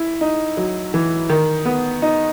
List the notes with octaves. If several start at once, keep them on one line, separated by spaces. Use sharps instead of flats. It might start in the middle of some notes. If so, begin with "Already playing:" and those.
Already playing: E4
D#4
F#3
E3
D#3
B3
D#4